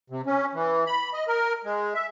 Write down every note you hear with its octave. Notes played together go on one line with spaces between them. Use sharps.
C3
C#4
E3
B5
D#5
A#4
G#3
E5